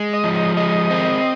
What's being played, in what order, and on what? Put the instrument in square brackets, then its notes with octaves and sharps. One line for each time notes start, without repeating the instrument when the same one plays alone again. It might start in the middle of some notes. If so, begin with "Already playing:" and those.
Already playing: [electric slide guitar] G#3
[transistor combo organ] D#5
[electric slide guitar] F3
[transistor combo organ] D#5
[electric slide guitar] G#3 [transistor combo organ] D#5
[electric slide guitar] C4